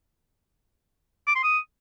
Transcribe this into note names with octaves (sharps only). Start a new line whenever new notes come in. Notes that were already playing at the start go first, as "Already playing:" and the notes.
D6
C6
D#6